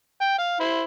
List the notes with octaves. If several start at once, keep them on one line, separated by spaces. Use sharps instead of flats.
G5
F5
E4 C5